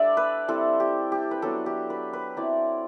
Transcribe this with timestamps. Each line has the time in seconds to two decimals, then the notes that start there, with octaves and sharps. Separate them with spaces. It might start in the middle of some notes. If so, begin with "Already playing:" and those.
Already playing: G3 D4 A4 D5 E5
0.17 B4
0.48 G3 C4 E4 A4
0.80 G4
1.12 G4
1.31 B4
1.42 F#3 B3 D4 A4
1.66 G4
1.90 B4
2.13 B4
2.37 F#3 C4 E4 D5